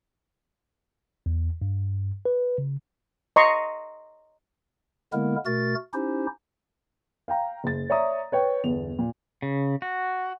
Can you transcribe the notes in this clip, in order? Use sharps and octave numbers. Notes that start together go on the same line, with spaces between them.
E2
G2
B4
C#3
D#5 A#5 C6 C#6
D3 G#3 A#3 B3 E4 A#4
B2 A3 F#4 A#4 A6
C#4 D#4 E4 G4 C5
F5 G5 A#5
F#1 A6
C#5 D5 E5 A#5 D#6
B4 C#5 G5
G1 E2 F7
A#2
C#3
F#4